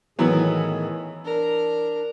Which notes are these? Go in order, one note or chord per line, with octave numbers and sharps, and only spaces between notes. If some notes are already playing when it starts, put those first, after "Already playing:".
A2 D#3 E3 F#3 B3 G#4
D4 A#4